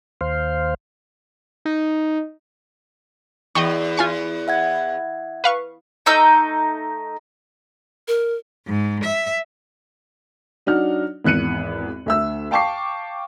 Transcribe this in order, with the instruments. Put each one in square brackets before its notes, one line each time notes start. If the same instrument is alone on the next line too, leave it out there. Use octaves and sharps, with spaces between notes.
[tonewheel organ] D#2 C5 F5
[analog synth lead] D#4
[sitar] E2 [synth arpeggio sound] D#5 G5 C#6
[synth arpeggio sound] F4 G#5 C#6
[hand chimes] E5 F#5 G#6
[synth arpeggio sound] B4 F5 C#6
[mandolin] A3 D#4 E6 G6
[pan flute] A#4
[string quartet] G#2
E5
[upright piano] F#3 D4 D#4 F#4 F6
G#1 E2 F#6 C#7 D#7
D2 E5 E6
F5 G5 A5 C#6 D6 C7